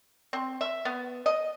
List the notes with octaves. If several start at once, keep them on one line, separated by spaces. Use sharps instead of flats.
C4
E5
B3
D#5